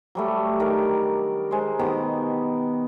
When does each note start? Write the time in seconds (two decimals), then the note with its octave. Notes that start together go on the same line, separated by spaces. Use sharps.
0.15 F#3 G3 A3
0.60 D#3 D4 A#4 D5
1.51 G#3 C5
1.79 B2 D#3 B3 G4